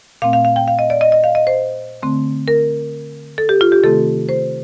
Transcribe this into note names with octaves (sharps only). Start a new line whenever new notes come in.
A#2 A3 C4 F5
F5
F5
G5
F5
D#5
D5
D#5
D#5
F5
D#5
C5
D3 A3 C4
A#4
A4
G4
F4
G4
C3 D#3 A3 C4 A4
C5